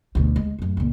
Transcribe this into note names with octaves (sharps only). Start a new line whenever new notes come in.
D2 B2
G#3
F#2 A2
C#2 A#2